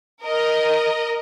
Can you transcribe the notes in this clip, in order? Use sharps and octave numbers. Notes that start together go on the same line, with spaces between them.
A#4 D#5